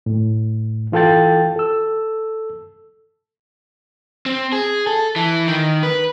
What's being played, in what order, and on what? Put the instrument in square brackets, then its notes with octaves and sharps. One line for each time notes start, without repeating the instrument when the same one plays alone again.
[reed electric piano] A2
E3 F4 A4 G5 A6
A4 E6
[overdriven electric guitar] C4
G#4
A4
E3
D#3
B4